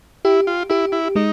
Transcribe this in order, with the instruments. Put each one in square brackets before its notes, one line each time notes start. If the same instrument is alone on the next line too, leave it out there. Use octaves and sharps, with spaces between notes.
[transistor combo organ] E4 [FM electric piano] G4
[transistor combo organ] F4
[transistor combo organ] E4 [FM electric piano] G4
[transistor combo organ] E4
[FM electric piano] G#3 [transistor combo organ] D#4